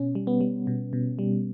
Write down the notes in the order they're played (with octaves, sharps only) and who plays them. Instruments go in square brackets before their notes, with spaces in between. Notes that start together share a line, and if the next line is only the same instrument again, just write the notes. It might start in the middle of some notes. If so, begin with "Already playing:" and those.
Already playing: [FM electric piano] B2 C#4
G3
B3
G3
B2
B2
G3